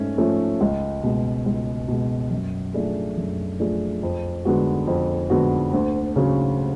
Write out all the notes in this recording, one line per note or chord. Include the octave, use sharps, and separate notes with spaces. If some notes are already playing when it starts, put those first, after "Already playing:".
Already playing: G#2 A3 C#4
F3 A3 C#4
C#2
B2 G#3
C#2
B2 G#3
F#2
F3 A3 D4 G#4
F#2
F3 A3 D4 G#4
F2
D3 G#3 B3 F#4
F2
D3 G#3 B3 F#4
D2
C#3 F#3